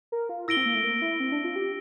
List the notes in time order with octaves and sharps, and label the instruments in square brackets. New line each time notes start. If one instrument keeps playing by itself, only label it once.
[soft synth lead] A#4
F4
[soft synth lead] E4 [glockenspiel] E6 A#6 D7 G7
[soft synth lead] C4
A#3
A3
A#3
E4
C4
D4
F4
G4